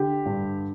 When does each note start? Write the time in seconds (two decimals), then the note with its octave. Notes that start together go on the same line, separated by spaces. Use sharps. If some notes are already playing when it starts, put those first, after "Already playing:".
Already playing: D3 G4
0.26 G2